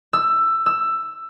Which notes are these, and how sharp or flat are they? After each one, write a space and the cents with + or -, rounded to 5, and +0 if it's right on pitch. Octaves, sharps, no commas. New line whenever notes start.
E6 +15
E6 +10